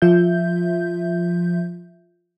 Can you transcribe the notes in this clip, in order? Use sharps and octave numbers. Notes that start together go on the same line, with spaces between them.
F3 F4 E5 G6